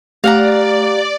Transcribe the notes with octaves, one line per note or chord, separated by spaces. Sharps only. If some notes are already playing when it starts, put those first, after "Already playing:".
A3 G4 D5 F5 F#5 A#5